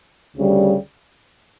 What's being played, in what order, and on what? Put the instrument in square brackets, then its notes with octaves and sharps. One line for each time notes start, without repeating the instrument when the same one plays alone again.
[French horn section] D2 C#3 G3